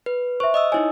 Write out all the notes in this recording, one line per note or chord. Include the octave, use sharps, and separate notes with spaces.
B4
C5 E5 C#6
D#5 D#6 E6
D#4 E4 C#5 G#5